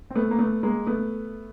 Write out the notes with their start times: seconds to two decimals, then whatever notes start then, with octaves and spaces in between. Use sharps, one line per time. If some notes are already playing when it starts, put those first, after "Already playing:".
0.10 C4
0.15 A3 B3
0.31 A#3
0.39 A3 B3
0.63 G#3 A#3
0.86 A3 B3